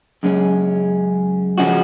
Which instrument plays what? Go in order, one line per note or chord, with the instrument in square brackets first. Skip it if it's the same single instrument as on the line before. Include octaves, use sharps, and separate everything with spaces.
[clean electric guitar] F#2 C#3 G#3 C#4
C#3 F3 G#3 C#4 F#4